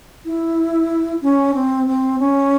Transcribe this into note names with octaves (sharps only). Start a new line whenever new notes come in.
E4
C#4
C4
C4
C#4